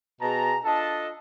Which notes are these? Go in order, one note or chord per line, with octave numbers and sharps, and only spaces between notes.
B2 G#4 A5 A#5
D4 F4 A4 D#5 A5